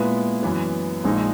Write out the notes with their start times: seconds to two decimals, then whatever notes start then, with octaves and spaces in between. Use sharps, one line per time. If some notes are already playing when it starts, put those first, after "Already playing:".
Already playing: A#2 G#3 B3 E4
0.43 F#2 E3 B3
1.04 A#1 A#2 G#3 D#4